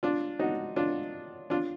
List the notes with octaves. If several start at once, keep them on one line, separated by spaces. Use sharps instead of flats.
D4 F4
D#4 F#4
D4 F4
D4 F4